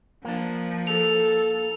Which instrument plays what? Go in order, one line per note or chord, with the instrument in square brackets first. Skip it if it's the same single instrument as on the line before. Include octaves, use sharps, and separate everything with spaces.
[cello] F3 [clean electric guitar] A#3 D4
[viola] A4 [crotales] F7